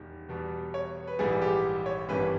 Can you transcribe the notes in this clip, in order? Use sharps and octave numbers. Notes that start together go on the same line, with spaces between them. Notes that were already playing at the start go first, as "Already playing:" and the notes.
Already playing: E1 D#3 G3
E2 B2 G3
C#5
B4
A#1 G#2 E3 G3 G#4
G4
C#5
G#1 G2 E3 G3 B4